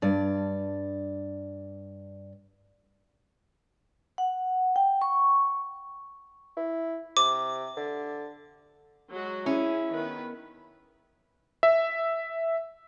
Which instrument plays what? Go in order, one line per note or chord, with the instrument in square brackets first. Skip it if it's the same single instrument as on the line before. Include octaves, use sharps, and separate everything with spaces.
[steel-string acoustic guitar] G2 D5
[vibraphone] F#5
G5
C#6
[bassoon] E4
[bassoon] C3 [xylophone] D6
[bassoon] D3
[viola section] F#3 G#3 F#4
[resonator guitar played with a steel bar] C#4 [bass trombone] E4 [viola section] G#4
[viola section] D#3 B3 B4
[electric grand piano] E5